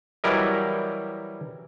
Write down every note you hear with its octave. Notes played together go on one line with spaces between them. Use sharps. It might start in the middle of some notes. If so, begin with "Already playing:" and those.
E3 F#3 G3 E4 A#4 D#5